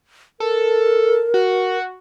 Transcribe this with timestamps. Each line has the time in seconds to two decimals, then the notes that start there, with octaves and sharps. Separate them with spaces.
0.40 A4 A#4
1.34 F#4